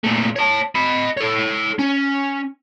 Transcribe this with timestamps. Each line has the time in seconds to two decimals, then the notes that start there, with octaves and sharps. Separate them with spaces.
0.04 A#2 A3
0.36 C#5 A5
0.75 D#5 B5
1.17 A4 C#5
1.79 C#4